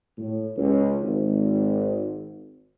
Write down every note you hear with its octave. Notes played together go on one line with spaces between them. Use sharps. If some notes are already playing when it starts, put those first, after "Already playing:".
A2
C#2
G#1